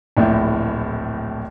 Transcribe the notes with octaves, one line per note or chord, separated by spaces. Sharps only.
D1 A#1 A2 E4